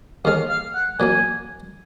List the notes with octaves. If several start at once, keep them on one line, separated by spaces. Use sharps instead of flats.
D#2 D#3 G#3 F5
F5
F#5
A#2 F#3 A#3 G#5